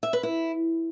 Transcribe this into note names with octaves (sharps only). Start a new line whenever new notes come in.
E5
B4
E4